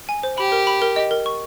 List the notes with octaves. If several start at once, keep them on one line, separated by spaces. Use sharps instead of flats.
G#5
C5
G4 B5
A#4
B5
A#4
D#5
A#4
C#6